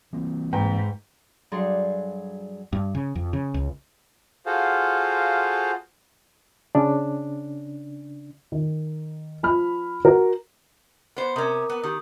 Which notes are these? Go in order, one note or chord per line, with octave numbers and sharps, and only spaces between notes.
E3 A#3 C4
G#2 B4 G5 A#5
G2 F#3 D4 G#4 A4 C6
G2
C#3
F2
C#3
C#2
F4 F#4 G#4 A4 C5 F5
C#3 D4
D#3
F3 B5 F6
F#4 A#4
B3 C5
C3 C#4 A#4 A#5 D#6
B3
D#3 G4 D#6